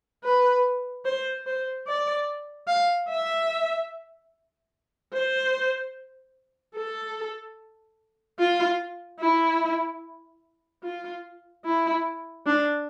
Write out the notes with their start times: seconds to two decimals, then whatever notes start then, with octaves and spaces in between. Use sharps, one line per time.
0.23 B4
1.05 C5
1.46 C5
1.87 D5
2.67 F5
3.09 E5
5.13 C5
6.75 A4
8.39 F4
9.20 E4
10.83 F4
11.65 E4
12.46 D4